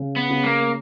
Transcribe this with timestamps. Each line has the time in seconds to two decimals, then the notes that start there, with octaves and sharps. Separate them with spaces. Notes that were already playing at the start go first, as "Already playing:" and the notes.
Already playing: C#3
0.16 B3
0.30 C#3
0.44 A#3